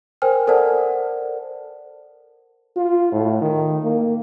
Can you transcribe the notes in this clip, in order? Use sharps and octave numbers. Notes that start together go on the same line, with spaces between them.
A#4 C5 G5 G#5 F6
A4 A#4 C5 D5 F#5 A5
F4
A2
D#3
A#3